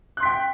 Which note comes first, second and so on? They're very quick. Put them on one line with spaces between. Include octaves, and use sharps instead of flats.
F#6 C6 B6 G5